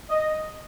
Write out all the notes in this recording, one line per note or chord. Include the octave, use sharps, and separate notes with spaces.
D#5